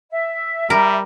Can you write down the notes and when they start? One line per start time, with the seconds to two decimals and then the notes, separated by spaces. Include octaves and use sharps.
0.11 E5
0.70 G3 A#4